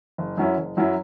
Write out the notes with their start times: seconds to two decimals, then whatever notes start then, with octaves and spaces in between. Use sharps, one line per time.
0.18 F#1
0.37 F#2 F#3 C#4 E4
0.58 F#1
0.77 F#2 F#3 C#4 E4